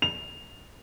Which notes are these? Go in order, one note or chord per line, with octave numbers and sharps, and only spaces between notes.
F7